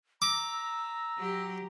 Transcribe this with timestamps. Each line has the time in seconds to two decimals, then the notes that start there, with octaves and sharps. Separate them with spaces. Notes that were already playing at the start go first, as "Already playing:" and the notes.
0.22 A#5 D6 E6
1.16 F#3 G4